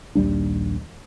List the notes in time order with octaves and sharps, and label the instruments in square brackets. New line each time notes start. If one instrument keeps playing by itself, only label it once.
[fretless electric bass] A#1 D#2 G3 D4